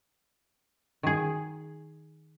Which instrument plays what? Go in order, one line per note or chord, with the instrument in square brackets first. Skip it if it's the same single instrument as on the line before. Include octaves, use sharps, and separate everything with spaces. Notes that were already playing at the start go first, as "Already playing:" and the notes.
[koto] D#3 G#4